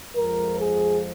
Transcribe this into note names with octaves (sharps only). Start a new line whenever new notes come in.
F2 F3 G#3 A#4
G#4